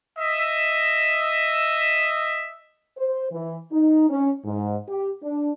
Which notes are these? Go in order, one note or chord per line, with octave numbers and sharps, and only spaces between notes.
D#5 E5
C5
E3
D#4
C#4
G#2
G4
D4